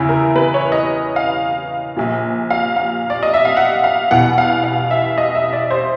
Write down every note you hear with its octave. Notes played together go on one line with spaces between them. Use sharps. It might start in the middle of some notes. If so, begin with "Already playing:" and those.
Already playing: E2 C#3 E3 E4
A#4
B4
C#5
D#5
F5
A#1 A#2
F5
F5
D5
D#5
E5
F5
F#5
F5
E2 B2 F#5
F5
F5
E5
D#5
E5
D5
C5